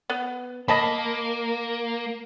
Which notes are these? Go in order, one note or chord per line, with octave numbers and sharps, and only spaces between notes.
B3
A#3 D#5 A5 B5